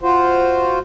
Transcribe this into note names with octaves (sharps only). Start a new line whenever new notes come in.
F4 F#4 C5